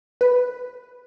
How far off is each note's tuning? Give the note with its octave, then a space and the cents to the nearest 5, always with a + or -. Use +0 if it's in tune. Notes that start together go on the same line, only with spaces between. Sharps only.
B4 +10